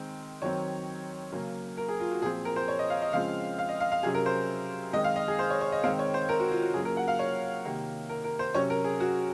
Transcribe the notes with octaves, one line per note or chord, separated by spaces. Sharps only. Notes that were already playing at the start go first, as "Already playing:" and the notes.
Already playing: D#3 G#3 C4
D#3 F#3 C4 C#5
C#3 F#3 A#3 C#4
A#4
G#4
F4
F#4
A#2 F3 C4 G#4
A#4
C5
C#5
D#5
F5
D#5
C#3 F3 G#3 C4 F5
F5
D#5
F5
F5
C3 F#3 C#4 G#4
A#4
C5
D#3 G#3 C4 D#5
F5
D#5
G#4
C5
C#5
C#5
D#5
D#3 G#3 C4 F5
C#5
C5
A#4
F#4
F4
F#4
C#3 F#3 A#3 G#4
A#4
F#5
F5
C#5
C3 D#3 A#3
A#4
A#4
C5
C3 F#3 C#4 C#5
A#4
G#4
F#4